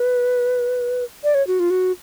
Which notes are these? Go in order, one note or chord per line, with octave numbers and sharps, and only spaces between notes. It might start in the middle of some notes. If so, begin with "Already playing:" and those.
Already playing: B4
D5
C#5
F#4
F4
F#4